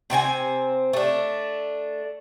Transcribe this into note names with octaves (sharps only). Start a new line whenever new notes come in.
C3 C4 E4 G#5
A3 D4